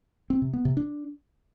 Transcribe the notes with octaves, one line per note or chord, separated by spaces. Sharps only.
C4
C3
B3
C3
D4